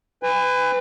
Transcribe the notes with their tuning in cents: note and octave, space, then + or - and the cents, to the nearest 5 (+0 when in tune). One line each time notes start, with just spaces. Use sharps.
B4 +25 G#5 -35